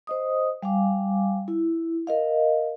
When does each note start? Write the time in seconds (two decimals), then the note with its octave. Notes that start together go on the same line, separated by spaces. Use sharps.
0.07 C5 D#5 D#6
0.63 G3 F5 G#5 D6
1.48 E4
2.07 A#4 D#5 F5